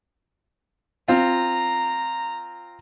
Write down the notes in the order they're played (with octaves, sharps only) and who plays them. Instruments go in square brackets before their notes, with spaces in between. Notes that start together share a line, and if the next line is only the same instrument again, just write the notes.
[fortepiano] C4 F4 [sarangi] A#5